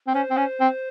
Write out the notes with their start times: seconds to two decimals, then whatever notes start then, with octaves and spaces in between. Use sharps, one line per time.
0.07 C4
0.14 C#4 C5
0.30 C4
0.37 C#4
0.60 C4